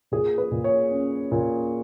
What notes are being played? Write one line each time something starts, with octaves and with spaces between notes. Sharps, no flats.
A#2 G#4
B4
A#2
C#5
C#4
A#2